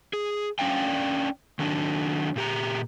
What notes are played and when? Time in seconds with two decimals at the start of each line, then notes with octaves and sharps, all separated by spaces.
0.13 G#4
0.59 C#4 D4 D5 F5 G5
1.59 D#3 F#3 D4
2.36 A#2 G4 A#5